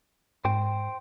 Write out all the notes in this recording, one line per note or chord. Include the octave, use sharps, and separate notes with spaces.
G#2 C5 G5